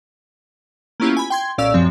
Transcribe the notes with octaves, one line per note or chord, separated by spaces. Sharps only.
A#3 B3 C#4 E4 F4 G4
G#5 B5
G5 C6 G#6
B1 A#2 C#4 D5 F5 E6
F#2 F3 G#3 C4